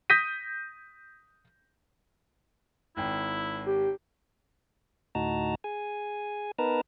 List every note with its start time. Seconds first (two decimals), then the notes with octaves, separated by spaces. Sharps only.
0.10 D#6 G6 A#6 B6 D#7
2.97 G#1 E4 G5
3.66 G4
5.15 D2 A2 D#4 F#4 A5 A#5
5.64 G#4 G#5
6.59 B3 D#4 A#4 B4 A5 A#5